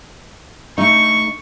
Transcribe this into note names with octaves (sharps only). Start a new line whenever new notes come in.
A3 D#4 C#6